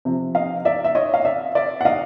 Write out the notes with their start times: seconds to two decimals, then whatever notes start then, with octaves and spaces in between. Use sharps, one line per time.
0.05 C3 F3
0.35 D#5 F5
0.65 D5 E5
0.84 E5
0.95 C#5 D#5
1.14 F5
1.25 D5 E5
1.55 D5 E5
1.81 F#5
1.85 D#5 F5